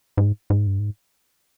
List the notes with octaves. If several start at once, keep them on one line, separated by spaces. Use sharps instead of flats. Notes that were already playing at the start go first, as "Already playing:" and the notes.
G#2
G#2
G2
G#2